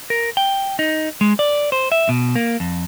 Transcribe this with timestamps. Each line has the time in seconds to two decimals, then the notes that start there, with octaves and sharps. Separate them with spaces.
0.10 A#4
0.37 G5
0.79 D#4
1.21 G#3
1.39 D5
1.72 C5
1.92 E5
2.09 B2
2.36 A#3
2.60 F2